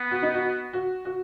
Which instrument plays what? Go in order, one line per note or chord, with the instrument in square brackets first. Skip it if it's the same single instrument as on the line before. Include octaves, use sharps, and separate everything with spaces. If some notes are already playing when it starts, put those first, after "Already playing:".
Already playing: [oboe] B3
[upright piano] F#4
D#4
F#4
F#4
F#4